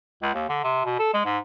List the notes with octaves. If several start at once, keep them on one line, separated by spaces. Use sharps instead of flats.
C#2
D#2
D3
C3
B2
A4
G#3
G#2